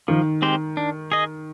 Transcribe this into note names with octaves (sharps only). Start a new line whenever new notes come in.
D#3 F3
G#3 C4 G4 C5
D4
G#4 D#5